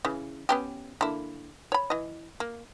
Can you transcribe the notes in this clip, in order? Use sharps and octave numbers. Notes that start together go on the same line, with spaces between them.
C#3 E3
B3 C#4 G4
D3 A#3 E4
C#5 B5
E3 D#5
A#3